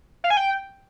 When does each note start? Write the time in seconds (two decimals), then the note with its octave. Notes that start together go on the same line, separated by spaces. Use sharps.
0.24 F5
0.30 G#5
0.37 G5